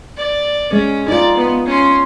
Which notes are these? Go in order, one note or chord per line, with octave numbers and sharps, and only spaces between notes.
D5
G#3 C#4
D#4 F4 D5
B3
C#4 C6